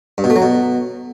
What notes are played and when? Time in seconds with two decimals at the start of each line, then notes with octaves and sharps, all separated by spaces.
0.18 G2
0.24 B2
0.30 A3
0.36 F#3
0.42 B2